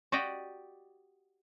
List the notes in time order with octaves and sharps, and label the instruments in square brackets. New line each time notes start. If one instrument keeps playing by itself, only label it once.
[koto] F#4 G4 D5 D#5 G5